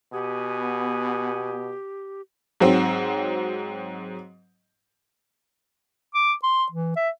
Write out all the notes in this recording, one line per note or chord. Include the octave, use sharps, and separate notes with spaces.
B2 B3 G4 F#5 G#5 D#6
G#2 F#3 C4
D6
C6
E3
E5